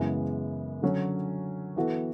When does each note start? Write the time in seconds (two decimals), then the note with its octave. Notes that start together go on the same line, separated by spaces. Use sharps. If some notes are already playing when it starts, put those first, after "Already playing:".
Already playing: F#2 C#3 E3 G#3 B3
0.82 D3 F#3 C#4
1.76 E3 B3 F#4 A4